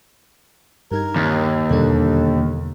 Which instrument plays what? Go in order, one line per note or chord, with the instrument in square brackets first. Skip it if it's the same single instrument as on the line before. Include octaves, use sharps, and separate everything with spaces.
[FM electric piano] G2 D#4 G#6 [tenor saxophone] A#4
[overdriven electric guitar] D#2
[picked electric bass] E2 B2 D3 [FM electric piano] G3 D4 [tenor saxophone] A4